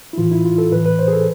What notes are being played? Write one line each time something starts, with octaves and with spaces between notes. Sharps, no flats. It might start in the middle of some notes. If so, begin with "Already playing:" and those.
E4
A2 E3 F4
E4
F4
A4
A2 E3 B4
B4
C5
G#4
A4